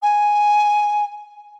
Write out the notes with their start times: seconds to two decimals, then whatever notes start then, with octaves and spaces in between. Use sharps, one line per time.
0.02 G#5